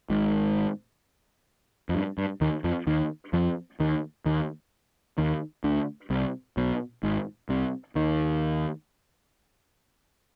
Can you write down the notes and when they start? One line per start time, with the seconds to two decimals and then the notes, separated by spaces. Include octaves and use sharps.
0.10 G#1 G#2
1.89 F2
1.95 G2
2.18 G2
2.41 D#2 D#3
2.64 F2 F3
2.87 D#2 D#3
3.33 F2 F3
3.80 D#2 D#3
4.26 D#2 D#3
5.18 D#2 D#3
5.64 D2 D3
6.10 C2 C3
6.57 B1 B2
7.03 G#1 G#2
7.49 C2 C3
7.95 D#2 D#3